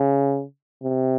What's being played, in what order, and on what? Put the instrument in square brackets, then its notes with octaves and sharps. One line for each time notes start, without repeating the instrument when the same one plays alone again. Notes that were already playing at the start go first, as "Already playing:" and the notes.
Already playing: [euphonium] C#3
C3